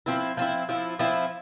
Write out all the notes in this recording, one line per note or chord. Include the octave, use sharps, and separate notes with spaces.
F3 C4 E4
F3 C4 E4
F3 C4 E4
F3 C4 E4